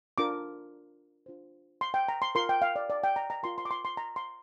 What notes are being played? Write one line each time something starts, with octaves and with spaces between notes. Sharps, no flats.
D4 F4 A#4 D6
D4 F4 C5
C6
G5
A#5
C6
F4 A#4 C6
G5
F5
D5
D5
G5
A#5
A#5
F4 A#4 C6
C6
D6
C6
C6
A#5
C6